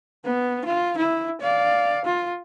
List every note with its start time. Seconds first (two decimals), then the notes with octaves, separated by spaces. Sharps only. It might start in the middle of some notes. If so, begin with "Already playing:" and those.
0.24 B3
0.64 F4
0.97 E4
1.41 D5 F5
2.04 F4